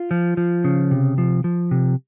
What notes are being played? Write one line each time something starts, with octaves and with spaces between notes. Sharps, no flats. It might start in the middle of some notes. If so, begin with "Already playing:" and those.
Already playing: F4
F3
F3
C#3
C3
F3
F3
C3